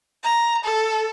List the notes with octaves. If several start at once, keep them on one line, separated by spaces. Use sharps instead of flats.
A#5
A4